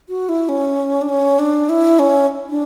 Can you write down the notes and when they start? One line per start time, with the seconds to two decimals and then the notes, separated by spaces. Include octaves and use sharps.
0.09 F#4
0.29 E4
0.49 C#4
1.01 D4
1.09 C#4
1.39 D4
1.69 E4
1.99 C#4
2.50 D4